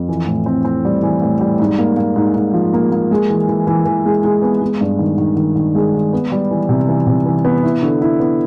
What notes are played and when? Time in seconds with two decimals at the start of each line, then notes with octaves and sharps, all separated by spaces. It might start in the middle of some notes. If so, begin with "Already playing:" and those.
Already playing: F2
0.09 E3
0.27 A2
0.46 C4
0.65 C4
0.85 G3
1.03 E3
1.22 A2
1.41 G3
1.60 G#2
1.78 A#3
1.97 A#3
2.16 G#2
2.35 G#2
2.54 F3
2.73 A#3
2.92 A#3
3.11 G#3
3.30 E3
3.49 E3
3.67 E3
3.85 E3
4.06 G#3
4.24 G#3
4.42 B3
4.61 G#3
4.81 G2
4.99 D#3
5.18 D#3
5.36 D#3
5.56 D#3
5.75 G#3
5.94 D#3
6.13 B3
6.32 G3
6.51 E3
6.69 C3
6.88 E3
7.07 C3
7.26 E3
7.45 B3
7.63 E4
7.82 D3
8.01 E4
8.20 B3